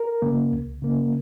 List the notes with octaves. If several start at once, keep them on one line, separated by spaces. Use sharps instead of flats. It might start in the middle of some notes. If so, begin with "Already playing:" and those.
Already playing: A#4
C#3 A#3
C#2
C#3 A#3